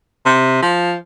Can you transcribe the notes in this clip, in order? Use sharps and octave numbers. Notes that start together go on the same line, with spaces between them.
C3
F3